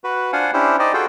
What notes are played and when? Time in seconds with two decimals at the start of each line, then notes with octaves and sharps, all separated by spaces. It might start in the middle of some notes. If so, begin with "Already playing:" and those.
0.04 F#4 B4
0.33 D4 F4 C5 F5 F#5 G#5
0.53 C#4 D4 E4 G4 C5
0.79 D#4 G4 C5 D5 D#5
0.93 F4 F#4 G#4 A4 C5 G5